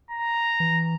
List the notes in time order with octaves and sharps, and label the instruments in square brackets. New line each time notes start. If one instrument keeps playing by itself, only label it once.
[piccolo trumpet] A#5
[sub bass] E3